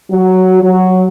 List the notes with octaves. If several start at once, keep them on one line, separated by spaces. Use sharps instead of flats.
F#3
F#3